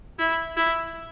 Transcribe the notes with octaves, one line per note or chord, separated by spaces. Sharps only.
E4
E4